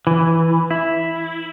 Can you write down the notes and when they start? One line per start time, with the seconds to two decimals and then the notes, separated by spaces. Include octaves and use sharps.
0.07 E3
0.71 E4